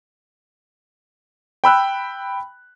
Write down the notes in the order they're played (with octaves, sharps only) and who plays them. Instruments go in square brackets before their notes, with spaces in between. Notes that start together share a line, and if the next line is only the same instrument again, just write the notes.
[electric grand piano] G5 B5 E6 F#6